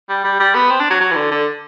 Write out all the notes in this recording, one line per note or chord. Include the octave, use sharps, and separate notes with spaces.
G3
G3
G3
B3
C4
D4
F#3
F#3
E3
D3
D3